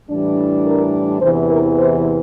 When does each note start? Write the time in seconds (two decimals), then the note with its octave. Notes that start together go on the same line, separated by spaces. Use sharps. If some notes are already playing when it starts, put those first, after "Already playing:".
0.10 A2 E3 G3 D4
0.65 A#4
1.21 E2 C3 E3 C5
1.50 A#4
1.78 C5